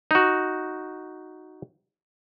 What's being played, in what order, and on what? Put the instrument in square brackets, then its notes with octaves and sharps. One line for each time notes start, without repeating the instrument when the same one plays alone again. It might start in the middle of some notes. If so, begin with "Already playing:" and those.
[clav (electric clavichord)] D#4 F#4